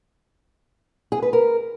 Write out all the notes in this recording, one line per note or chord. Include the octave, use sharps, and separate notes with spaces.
G#4
B4
A#4